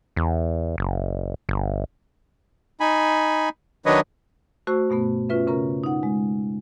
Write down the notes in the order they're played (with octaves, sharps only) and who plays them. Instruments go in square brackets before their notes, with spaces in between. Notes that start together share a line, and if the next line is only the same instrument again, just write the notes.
[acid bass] E2
F#1
G1
[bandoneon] D#4 G#5 B5
D#3 F#3 D4 B4 C#5 D#5
[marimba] A3 F#4 C5 C#6 E6
G2 B2 A3 B3
C#4 F4 B4 E5
C#3 C#4 A#4 A#5
D#4 F#5
G#3